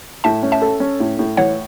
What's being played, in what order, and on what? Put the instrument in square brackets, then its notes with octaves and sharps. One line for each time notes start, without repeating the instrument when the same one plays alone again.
[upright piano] A2 [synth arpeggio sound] E5 A5
[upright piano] C#4
[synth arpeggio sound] E5 A5
[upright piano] A4
C#4
A2
A2
[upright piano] E3 [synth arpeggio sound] C#5 F#5